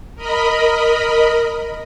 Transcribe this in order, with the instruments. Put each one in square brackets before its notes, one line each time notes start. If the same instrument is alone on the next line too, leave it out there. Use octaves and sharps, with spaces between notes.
[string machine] A#4 D#5 B5